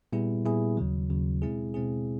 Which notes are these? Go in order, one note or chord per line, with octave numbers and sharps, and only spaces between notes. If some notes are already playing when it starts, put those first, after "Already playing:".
A#2 G3 B3 E4 G#4
A#2 G3 B3 E4 G#4
D#2 C#3 F#3
D#2 C#3 F#3
B2 G#3 C4 E4 G#4
B2 G#3 C4 E4 G#4